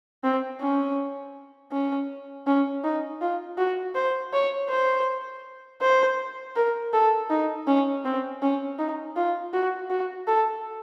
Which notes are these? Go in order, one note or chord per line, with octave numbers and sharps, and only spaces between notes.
C4
C#4
C#4
C#4
D#4
F4
F#4
C5
C#5
C5
C5
A#4
A4
D#4
C#4
C4
C#4
D#4
F4
F#4
F#4
A4